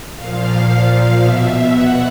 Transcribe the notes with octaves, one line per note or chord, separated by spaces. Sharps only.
A#2 F3 F5
B2 E5
F#5